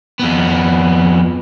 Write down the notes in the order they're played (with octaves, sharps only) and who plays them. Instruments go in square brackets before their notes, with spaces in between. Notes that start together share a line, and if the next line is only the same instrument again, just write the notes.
[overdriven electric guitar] F2 B3